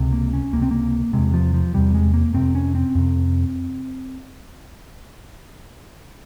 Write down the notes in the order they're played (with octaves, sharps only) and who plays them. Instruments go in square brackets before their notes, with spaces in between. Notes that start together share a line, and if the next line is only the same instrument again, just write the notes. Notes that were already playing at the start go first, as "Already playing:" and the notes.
Already playing: [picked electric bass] C#2 C3
A#3
C#4
C#2 C3 A#3
C4
A#3
E2 C3 G#3
F3
F3
E2 C3 G3
G#3
A#3
F2 C3 C4
C#4
C4
F2 C3